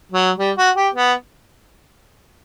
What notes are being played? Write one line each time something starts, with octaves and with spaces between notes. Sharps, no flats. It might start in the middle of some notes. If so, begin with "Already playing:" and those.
F#3
G3
F#4
G4
B3